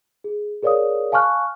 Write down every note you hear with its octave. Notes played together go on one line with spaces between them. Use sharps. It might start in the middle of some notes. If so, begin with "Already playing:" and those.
G#4
G#4 A#4 C#5 D5 F5 D#6
F5 G#5 A5 C#6 F6 F#6